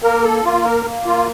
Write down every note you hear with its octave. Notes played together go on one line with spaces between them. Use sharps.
A#3 A#4
A4
A#3 F4
A#4
A#3
F4